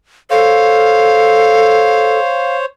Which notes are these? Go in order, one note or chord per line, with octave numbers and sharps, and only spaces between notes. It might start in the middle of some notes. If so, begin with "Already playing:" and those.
A4 C5 C#5 F5